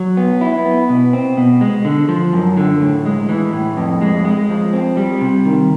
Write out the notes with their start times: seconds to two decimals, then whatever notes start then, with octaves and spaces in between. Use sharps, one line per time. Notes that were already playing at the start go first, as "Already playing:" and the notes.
Already playing: F#3
0.17 B3
0.41 E4
0.66 B3
0.89 B2
1.13 C4
1.37 B2
1.61 G#3
1.85 D3
2.09 F3
2.33 F#2
2.57 D3
2.81 A2
3.05 G#3
3.29 E3
3.53 A2
3.77 F2
4.01 G#3
4.25 G#3
4.49 F3
4.73 C4
4.97 G3
5.21 C3
5.45 D#3